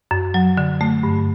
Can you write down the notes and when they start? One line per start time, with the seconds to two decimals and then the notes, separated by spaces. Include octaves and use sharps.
0.11 F#2
0.34 F#3
0.57 D3
0.81 A3
1.03 G2